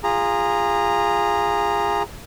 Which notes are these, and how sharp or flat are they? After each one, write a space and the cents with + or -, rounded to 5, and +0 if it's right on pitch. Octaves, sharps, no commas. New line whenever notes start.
F4 +0 G#4 -20 A#5 +0